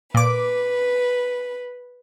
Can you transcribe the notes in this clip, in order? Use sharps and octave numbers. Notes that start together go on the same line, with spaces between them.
A#2 B4 D6